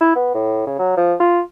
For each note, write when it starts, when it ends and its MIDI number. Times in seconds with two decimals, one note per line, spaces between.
0.01 0.13 64
0.16 0.34 59
0.34 0.62 45
0.67 0.74 49
0.79 0.93 54
0.97 1.14 53
1.20 1.40 65